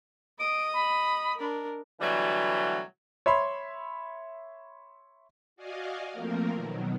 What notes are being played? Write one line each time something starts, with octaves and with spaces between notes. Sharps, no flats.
D#5 D#6 D7
B5
D4 A#4
B2 D3 E3 F#3 G3 A3
C#5 E5 B5 C6
F#4 D5 D#5 F5 G#5
F3 A3 A#3 C4 A#4
B2 D#3 F#3